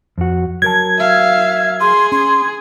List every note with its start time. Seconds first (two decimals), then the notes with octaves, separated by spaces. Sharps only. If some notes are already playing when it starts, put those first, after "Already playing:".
0.18 F2 F#4
0.62 F#3 A#4 A5 G#6
0.99 E5 F5
1.81 G#4 C6
2.12 C#4 C6